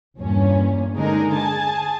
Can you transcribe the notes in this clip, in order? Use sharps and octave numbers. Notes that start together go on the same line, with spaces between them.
E2 G2 A#2 C#4
D3 G#3 D#4 G#4 A#4
G#4 G#5 A5